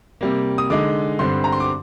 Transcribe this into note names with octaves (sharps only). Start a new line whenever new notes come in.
C3 G3 A#3
D#6
D3 G#3 D#4 D6
G2 D3 G3 C4 C6
A#5
C6
D6